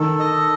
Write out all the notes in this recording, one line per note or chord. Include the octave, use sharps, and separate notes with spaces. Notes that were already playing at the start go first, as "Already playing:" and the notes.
Already playing: D#3 A4
D#5